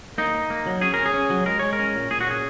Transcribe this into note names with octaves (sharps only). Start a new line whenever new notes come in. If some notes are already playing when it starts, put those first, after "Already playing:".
A#3 D#4
A#3
A#3
F#3
C#4 G#4
C#4 A#4
G#4
C#4
F#3
G#3 A#4
G#3 C#5
A#4
C#4
A#2
A#2 G#4
F#4
C#4 G#4